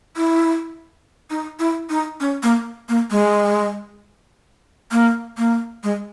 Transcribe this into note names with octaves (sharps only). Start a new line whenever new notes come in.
E4
D#4
E4
D#4
C#4
A#3
A#3
G#3
A#3
A#3
G#3